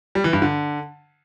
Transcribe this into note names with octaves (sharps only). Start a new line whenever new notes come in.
G3
E3
G2
D3